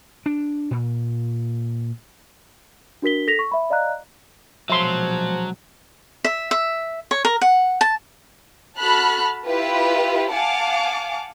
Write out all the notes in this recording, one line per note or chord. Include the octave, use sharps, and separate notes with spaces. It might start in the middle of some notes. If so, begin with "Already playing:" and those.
D4
A#2
D4 F#4 A#4 B6 G7
A4 A#6 B6 F7
C#6
E5 B5
D5 D#5 F5 A#5 F#6
A#1 B2 F3 F#3 G#3 E5 C6
E5
E5
C#5
A#4
F#5
A5
F#4 A4 A5 B5 F6 F#6
E4 F4 G4 B4
F5 F#5 G#5 A5 D6